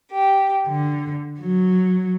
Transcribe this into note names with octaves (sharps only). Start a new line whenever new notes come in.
G4
D3
F#3